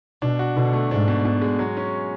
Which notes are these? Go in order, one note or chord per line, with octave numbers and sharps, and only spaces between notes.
B2 D4
F#4
B2 D3
A3
G#2 D4
B2
B2
G#3
F#3
C#4